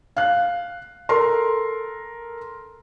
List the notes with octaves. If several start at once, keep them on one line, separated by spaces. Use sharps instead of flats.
F5 F#6
A4 A#4 A#5 C6